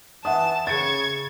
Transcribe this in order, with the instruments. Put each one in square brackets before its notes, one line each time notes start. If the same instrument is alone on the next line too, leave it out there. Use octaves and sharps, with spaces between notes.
[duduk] E3 [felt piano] E5 F#5 D#6 [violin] A5
[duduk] C#3 [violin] C#6 G#6 [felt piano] A6 C#7